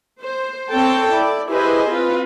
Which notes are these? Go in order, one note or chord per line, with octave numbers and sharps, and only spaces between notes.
C5
C4 A4 C#5 G5 A5
E4 D5
E4 G4 G#4 B4 C5 D#5
C4 F4 B4